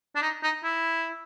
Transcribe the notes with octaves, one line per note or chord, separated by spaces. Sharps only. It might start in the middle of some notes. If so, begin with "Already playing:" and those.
D4
D#4
D#4
E4